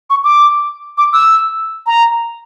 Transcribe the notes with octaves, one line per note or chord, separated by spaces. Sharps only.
C#6
D6
D6
E6
A#5